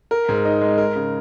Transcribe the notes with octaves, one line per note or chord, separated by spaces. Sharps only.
A#4
G#2
D#4
G#3
A#4
C#3